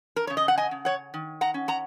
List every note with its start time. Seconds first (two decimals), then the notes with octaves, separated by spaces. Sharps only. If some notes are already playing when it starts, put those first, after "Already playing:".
0.16 A#4
0.27 C#3 C#5
0.37 D#5
0.48 F#5
0.58 D#5 G#5
0.71 C#3
0.85 C#5 F#5
1.14 D#3
1.41 F#5 A#5
1.54 C#4
1.68 F#5 A#5